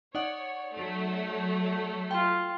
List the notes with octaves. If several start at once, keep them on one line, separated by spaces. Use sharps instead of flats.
D#4 C#5 D5 F#5
F#3 A3
F4 G5